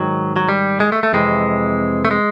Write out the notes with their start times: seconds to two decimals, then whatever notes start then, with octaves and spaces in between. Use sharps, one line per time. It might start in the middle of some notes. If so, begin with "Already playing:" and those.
Already playing: G#2 D#3 F#3
0.36 F#3
0.49 G3
0.80 G#3
0.92 A3
1.03 A3
1.13 F2 C3 E3 G#3
2.05 A3
2.11 G#3